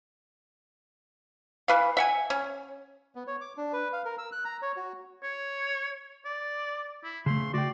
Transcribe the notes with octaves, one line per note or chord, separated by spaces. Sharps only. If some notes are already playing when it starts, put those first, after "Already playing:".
E3 B4 F5
E5 F#5 G#5
C#4
B3
C#5
D6
D4
B4
F5
A#4
E6
F#6
A#5
C#5
F#4
C#5
D5
E4
C#3 A3 C6
F#4 D5 G5